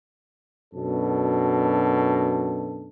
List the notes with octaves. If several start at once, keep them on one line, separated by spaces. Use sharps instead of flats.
F#2 B2 D4 A4